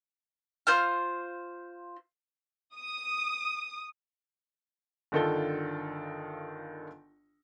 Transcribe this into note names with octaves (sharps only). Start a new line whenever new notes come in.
F4 C5 F6
D#6
G1 D3 D#3 F4 A4 G7